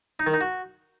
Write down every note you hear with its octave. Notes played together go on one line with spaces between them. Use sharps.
D#4
D#3
D#4
F#4